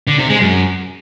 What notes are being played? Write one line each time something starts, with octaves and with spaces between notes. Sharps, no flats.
D3
C3
G#3
F#2